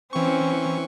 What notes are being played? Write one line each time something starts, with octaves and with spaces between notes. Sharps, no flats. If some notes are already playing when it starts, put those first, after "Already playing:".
E3 C4 C#4 C#6